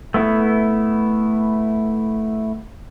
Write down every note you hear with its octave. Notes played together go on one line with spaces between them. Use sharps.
A3 B3 E4